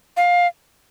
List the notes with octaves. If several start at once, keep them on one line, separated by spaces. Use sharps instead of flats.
F5